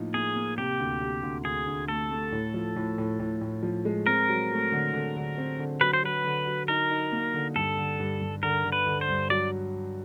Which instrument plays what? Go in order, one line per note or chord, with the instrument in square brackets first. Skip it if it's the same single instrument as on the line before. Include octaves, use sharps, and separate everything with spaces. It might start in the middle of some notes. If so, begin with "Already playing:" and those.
Already playing: [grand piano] A2 F3 A#3 D#4
[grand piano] A#3 [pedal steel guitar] G#4
[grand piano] A#3
[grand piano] C3 [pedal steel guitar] G4
[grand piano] D2
C3
D2
[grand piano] D2 [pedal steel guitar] G#4
[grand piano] D2
[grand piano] A3 [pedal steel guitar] A4
[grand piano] A3
A2
F3
A2
A2
A2
A2
F3
G#3
[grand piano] C4 [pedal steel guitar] A#4
[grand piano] F#3
A3
D3
D3
D3
C4
D3
[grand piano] F#3 [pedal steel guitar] B4
[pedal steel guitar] C5
[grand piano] F#3 [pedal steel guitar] B4
[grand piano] D3
F#3
[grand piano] D#4 [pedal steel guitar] A#4
[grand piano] D#4
A#3
D3
[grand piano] G2 [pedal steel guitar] A4
[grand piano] D3
G2
G2
[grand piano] D3 [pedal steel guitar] A#4
[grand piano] D3
[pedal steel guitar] B4
[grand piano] D3
[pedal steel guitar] C5
[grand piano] G2
[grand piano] F#3 [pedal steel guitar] D5